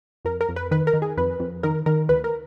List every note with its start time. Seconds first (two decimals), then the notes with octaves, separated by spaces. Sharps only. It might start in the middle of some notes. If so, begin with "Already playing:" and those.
0.25 F2 A#4
0.41 A#4
0.49 F2
0.56 B4
0.71 D#3 B4
0.87 A#4
0.94 D#3
1.02 G#4
1.17 F2 B4
1.40 F2
1.63 D#3 A#4
1.86 D#3 A#4
2.09 D2 B4
2.24 A#4